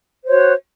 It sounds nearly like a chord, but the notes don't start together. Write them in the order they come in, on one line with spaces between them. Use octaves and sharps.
C5 C#5 F#4